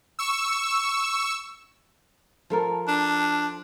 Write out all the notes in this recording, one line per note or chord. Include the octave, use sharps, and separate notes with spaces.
C#6 E6
F3 A4 A#4
D4